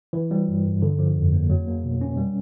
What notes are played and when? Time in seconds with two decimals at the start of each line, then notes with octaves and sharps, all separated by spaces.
0.13 E3
0.31 G3
0.48 G2
0.64 G2
0.82 D3
0.99 F3
1.15 F2
1.33 A#3
1.50 F#3
1.67 A#3
1.83 B2
2.01 C#4
2.17 G3